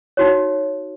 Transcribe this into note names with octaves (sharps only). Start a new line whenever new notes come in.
D#4 F#4 C#5